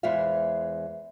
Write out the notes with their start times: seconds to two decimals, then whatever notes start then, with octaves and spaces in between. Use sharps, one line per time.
0.03 E2 E3 G#3 C5 E5 F5